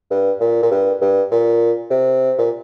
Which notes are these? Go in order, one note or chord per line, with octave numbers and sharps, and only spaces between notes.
G2
A#2
A#2
G2
G2
A#2
C3
A#2